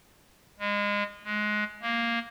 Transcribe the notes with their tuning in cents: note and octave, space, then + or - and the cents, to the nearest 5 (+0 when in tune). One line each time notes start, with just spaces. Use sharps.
G#3 -25
G#3 +20
A#3 +0